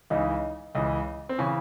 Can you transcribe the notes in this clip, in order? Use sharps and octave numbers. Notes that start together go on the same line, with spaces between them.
C#2 C#3 E3 D#4
C#2 C#3 E3
C4
C#3 E3 C#4